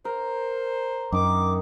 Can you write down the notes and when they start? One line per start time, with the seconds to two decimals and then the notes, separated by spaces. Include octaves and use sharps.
0.05 A#4 C5
1.12 F#2 D#3 D#4 D6